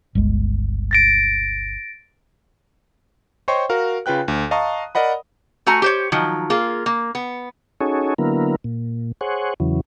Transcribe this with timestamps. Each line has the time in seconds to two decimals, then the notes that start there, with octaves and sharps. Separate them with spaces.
0.15 G1 C#2 G#3
0.91 A6 A#6 D7
3.48 C5 C#5 D#5 G5 C6 C#6
3.69 F#4 A#4 F5
4.06 C#3 F4 B4 G5 F#6
4.28 D2
4.51 D#5 F5 A5 A#5 C#6 D#6
4.95 A#4 D5 D#5 F#5 B5
5.66 A3 F#4 G#5 A#5
5.82 G4 C5 C#5
6.12 D#3 F3 F#3
6.50 A#3 F4 G#4
6.86 A#3
7.15 B3
7.80 C#4 D#4 F#4 G#4 A4 C#5
8.18 D3 F#3 A#3 B3 E4 A#4
8.64 A#2
9.21 G#4 C5 C#5 F#5
9.60 E2 C#3 E3 F#3